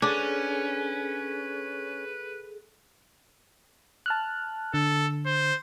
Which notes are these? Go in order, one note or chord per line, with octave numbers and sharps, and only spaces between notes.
C#4 D4 G#4 A4 B4
A5 F6 F#6
D3 A4
C5